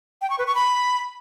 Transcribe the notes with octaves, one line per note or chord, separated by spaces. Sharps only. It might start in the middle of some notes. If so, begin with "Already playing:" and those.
G5
C#6
B4
C#6
B5